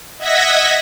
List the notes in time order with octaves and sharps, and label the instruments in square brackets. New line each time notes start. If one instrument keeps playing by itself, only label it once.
[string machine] D#5 E5 F#5 G#6 A#6 B6